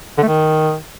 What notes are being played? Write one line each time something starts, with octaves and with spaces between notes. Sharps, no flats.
D3
A3
D#3